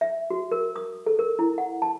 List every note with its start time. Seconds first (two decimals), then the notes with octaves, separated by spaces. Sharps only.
0.01 E5
0.30 F#4
0.52 A#4
0.76 D#6
1.06 A4
1.19 A#4
1.39 E4
1.58 F#5
1.82 A5